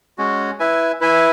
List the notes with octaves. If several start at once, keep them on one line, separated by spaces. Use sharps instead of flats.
G#3 C#4 F#4
E4 B4 E5 G#5
E4 B4 E5 G#5